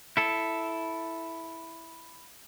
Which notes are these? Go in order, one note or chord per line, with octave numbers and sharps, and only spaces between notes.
E4 A4